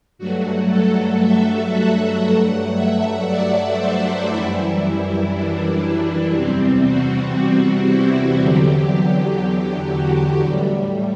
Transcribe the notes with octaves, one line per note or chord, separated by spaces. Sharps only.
G2 F#3 A3 F#4
A4
E5
F#5
G2 F#3 A3 F#5
E5
D5
C5
F#2 E3 G3 E4
D4
E2 C3 G3 C4
F#4
F#4
E4
E2 D3 F#3 G4
F#4
A2 G3